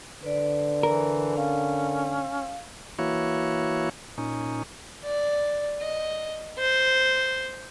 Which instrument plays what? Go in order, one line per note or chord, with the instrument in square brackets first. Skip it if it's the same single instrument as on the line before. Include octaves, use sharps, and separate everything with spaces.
[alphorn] D3 [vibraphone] B4 D5
[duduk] E3 [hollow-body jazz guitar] A#4
[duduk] C#4 [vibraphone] F5
[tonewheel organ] E3 A#3 E4 F#4 C#5
A#2 C#4 D#4
[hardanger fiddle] D5
D#5
C5